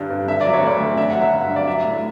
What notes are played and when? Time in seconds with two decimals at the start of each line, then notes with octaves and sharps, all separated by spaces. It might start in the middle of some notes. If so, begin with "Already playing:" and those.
Already playing: G2 D3 G3
0.10 G2
0.28 D3 E5
0.41 F#3 D5
0.53 C#5
0.63 D2 D5
0.80 D2
0.97 D3 E5
1.10 F#5
1.15 F#3
1.22 E5
1.33 G2
1.49 G2
1.56 D5
1.67 F#3 E5
1.84 A2